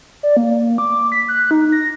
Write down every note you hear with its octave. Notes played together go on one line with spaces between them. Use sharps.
D5
A#3
D6
B6
F#6
D#4
A#6